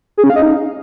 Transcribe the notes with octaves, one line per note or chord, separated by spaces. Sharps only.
G#4
C#4
F5
D#5
D#4